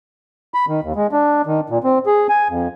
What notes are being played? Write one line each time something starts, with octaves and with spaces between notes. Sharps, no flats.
B5
D#3
D#2
G#3
D4
D#3
A#2
C4
G#4
G#5
F2